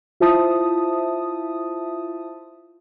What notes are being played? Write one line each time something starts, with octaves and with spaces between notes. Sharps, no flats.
E4 F4 C5 E5 A5 D#6